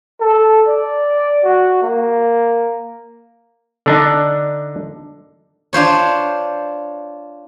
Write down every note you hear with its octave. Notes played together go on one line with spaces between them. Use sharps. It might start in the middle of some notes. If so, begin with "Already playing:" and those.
A4
D5
F#4
A#3
D3 D4 D#4
D4 F4 C5 C#5